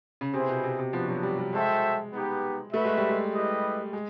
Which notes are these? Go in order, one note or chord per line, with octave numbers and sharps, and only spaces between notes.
C#3
C3 B3 E4 G#4 C5
B2
C3
C3
F3 B3 D4 F#4
F#3
G3
G3
G#3 F#4 A4 C5 E5 G5
B3 D#4 G4 B4
A3 F#4 B4 E5
G#3
G3
G#3
E4 G4 B4 D#5
G#3